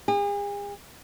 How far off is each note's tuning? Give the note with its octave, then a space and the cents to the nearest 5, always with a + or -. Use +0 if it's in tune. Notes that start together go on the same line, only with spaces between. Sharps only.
G#4 -40